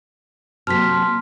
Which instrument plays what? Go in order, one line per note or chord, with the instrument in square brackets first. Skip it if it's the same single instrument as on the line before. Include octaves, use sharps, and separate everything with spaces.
[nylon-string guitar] C3 F#3 A#3 [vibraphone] A5 C6 [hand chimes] F6 B6